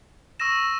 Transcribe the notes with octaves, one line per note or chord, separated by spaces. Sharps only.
C#6 E6 A#6 E7